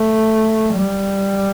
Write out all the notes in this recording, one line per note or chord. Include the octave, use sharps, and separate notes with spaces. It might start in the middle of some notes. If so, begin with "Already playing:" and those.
Already playing: A3
G3